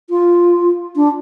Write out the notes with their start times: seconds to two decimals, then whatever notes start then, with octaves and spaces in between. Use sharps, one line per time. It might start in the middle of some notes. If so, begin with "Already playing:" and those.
0.10 F4
0.96 D4